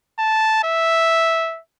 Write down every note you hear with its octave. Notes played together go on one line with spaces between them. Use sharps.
A5
E5